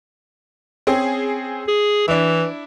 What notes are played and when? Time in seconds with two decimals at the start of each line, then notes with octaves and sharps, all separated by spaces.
0.87 C4 C#4 G#4
1.68 G#4
2.08 E3 D4 E4